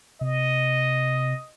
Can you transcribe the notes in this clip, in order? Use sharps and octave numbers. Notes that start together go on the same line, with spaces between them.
C3 D#5